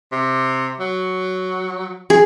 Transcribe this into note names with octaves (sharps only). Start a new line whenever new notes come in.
C3
F#3
G#4